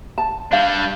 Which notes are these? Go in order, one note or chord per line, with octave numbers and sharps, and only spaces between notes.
A5
G3 D4 F5